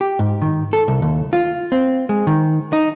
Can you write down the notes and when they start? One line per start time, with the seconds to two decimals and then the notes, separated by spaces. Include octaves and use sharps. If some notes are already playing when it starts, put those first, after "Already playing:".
0.01 G4
0.19 G#2
0.42 D#3
0.73 A4
0.88 C2
1.02 D#2
1.33 F4
1.72 C4
2.09 G#3
2.27 D#3
2.73 D#4